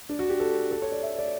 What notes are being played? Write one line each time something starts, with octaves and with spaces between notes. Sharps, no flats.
D4
F#4
G4
A4
A4
C#5
D5
E5
D5